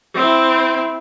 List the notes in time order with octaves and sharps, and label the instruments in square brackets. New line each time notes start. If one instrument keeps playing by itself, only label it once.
[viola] C4 E4